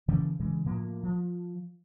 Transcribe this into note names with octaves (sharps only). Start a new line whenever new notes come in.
C#3 E3 F3 A#3
C#3 E3 G#3
A2 F3 A#3
F3